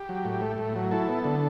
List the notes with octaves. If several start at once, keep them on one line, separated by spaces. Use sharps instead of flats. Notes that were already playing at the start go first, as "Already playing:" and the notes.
Already playing: G4
F#3
A2
A3
A2
F#3
E4 A4
B3
D3